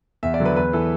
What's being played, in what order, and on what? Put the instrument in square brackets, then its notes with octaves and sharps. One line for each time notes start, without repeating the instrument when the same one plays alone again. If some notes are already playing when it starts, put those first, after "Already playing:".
[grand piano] E2 E5
D5
D3 F#3
B4
E2 B4
E3 A4